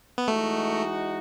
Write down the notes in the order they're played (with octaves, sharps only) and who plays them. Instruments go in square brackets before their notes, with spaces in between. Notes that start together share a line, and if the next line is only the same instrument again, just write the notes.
[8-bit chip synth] B3
[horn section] E3 G#3 D#4 F#4 [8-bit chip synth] A3